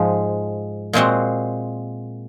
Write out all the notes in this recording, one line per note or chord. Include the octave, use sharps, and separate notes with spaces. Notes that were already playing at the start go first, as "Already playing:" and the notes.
Already playing: G#2 F3 G#3
A#2 G#3 C4 F#4